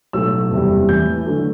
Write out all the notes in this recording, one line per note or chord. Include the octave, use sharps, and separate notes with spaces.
B1 A2 F#3 A3 E6
F#1 E2 C3 G3
A1 A2 E3 G6
D3 F#3 A3